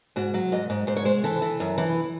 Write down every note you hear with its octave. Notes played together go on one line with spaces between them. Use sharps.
G#2 F#4
F#3
G#2 D#5
G#2
G#2 C5
C#5
G#3 C5
E3 A4
E3
F#2
E3